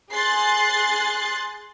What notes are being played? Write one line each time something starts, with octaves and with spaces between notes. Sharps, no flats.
G#4 C6 F#6 A6 C7